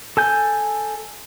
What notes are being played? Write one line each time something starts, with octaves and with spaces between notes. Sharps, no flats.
A4 G#5 G6